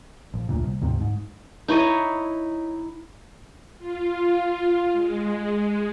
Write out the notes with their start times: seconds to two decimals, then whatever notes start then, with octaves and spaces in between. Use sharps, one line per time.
0.34 A#1
0.47 F1 D2 A#2
0.63 C2
0.82 D2 G#2 C3
1.01 G#2
1.68 D#4 E4 C#5 D#5
3.79 F4
4.92 G#3